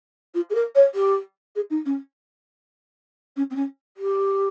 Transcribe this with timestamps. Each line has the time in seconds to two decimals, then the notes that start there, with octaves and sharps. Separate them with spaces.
0.34 F4
0.50 G#4
0.54 A#4
0.75 C#5
0.94 G4
1.55 G#4
1.70 D#4
1.85 C#4
3.36 C#4
3.50 C4
3.55 C#4
3.97 G4